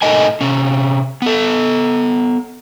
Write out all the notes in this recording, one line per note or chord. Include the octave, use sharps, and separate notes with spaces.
A2 D#4 A4 A#4 D#5 G#5
C3 C#4
B3 A4